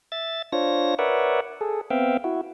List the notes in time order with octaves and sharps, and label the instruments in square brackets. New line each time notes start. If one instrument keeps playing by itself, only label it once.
[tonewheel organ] E5 A6
D4 F4 C5 C#5 A#6
A#4 B4 C#5 D5 E5 F#5
G#4 A4
B3 C4 E5 F5 G5
E4 F#4